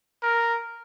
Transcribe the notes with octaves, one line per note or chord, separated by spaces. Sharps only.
A#4